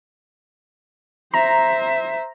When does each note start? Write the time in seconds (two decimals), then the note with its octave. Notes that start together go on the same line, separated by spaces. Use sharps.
1.34 C5 E5 A#5